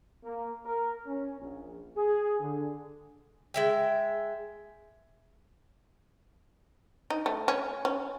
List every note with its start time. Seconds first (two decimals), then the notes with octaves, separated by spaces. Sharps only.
0.24 A#3
0.66 A#4
1.06 C#4
1.41 A#1
1.97 G#4
2.40 D3
3.54 G#3 E5 G5
7.10 D#4
7.26 A3
7.48 C#4
7.85 C#4